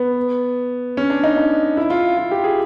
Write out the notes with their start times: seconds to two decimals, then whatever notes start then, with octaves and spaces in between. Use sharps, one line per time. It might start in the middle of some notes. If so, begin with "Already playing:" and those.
Already playing: B3
0.97 C#4
1.10 D4
1.24 D#4
1.37 D#4
1.77 E4
1.90 F4
2.17 F4
2.31 G4
2.44 G#4